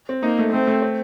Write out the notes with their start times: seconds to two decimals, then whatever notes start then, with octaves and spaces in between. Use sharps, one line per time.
0.09 C4
0.23 A#3 D#4
0.39 A3
0.53 A3 C4
0.67 A3
0.82 C4